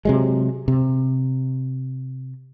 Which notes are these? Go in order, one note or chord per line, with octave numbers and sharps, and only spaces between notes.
C3 F#3 G#3
C3